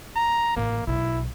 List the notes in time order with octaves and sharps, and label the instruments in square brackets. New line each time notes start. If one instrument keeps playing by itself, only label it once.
[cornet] A#5
[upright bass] A1 [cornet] A#3
[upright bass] B1 [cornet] E4